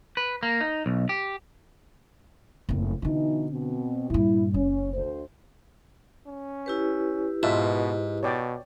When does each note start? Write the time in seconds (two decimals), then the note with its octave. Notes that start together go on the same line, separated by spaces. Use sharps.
0.17 B4
0.43 A#3
0.61 D#4
0.86 B1
1.09 G4
2.69 F#1 F2 A2
3.02 B2 D3 E3 D4 D#4
3.50 B2 C4
4.10 G2 A#2 E4
4.54 F#1 C#4
4.93 D2 C5
6.27 C#4
6.66 E4 G4 B4
7.43 G#2 B2 F4 E5 A5
8.23 B2 C#5 D5 G5